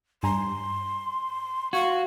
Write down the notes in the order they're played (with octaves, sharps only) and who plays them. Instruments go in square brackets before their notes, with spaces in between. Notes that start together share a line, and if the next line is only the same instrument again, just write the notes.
[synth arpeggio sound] G2 G#5 A#5 [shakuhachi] C6
[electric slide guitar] F#4 [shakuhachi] F5 [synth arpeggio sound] G#6